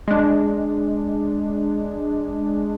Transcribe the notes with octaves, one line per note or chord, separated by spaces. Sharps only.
G#3 D4